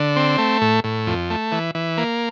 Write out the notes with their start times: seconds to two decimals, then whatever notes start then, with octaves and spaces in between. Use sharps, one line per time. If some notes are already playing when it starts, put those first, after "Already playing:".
Already playing: D3
0.16 C4
0.38 A3
0.62 A2
0.84 A2
1.07 F2
1.30 A3
1.52 E3
1.75 E3
1.98 A#3